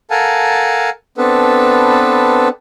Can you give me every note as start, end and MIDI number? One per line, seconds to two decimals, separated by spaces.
0.11 0.90 69
0.11 0.90 70
0.11 0.90 77
0.11 0.90 78
0.11 0.90 80
0.11 0.90 81
1.18 2.48 59
1.18 2.48 60
1.18 2.48 62
1.18 2.48 69
1.18 2.48 71